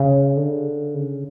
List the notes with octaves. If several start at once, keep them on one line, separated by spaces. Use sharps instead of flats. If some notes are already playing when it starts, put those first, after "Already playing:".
Already playing: C#3
D3
C#3